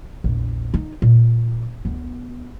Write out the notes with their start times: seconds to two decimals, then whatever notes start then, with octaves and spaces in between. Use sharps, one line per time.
0.24 A#1 E2
0.74 D#4
1.02 A#2
1.85 D2 B3